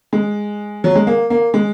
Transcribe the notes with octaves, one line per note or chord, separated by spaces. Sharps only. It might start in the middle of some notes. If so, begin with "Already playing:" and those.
G#3
F#3
G#3
A#3
A#3
G#3